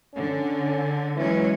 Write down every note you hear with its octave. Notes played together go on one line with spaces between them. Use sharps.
D3 C#4
E3 F#3 G#3 C#4